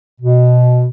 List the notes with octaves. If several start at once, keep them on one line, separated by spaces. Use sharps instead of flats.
B2